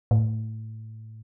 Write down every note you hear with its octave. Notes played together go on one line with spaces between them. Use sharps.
A2